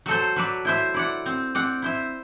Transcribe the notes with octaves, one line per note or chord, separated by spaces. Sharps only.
F#3 A4 C5
F#3 B4 D5
E4 C5 E5
E4 D5 F#5
C4
C4 D5 F#5
E4 C5 E5